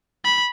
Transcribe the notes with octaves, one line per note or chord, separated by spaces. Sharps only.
B5